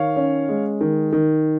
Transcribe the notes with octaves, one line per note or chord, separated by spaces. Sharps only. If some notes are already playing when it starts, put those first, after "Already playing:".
Already playing: D#3 C#5 F5
C#4
G#3
D#3
D#3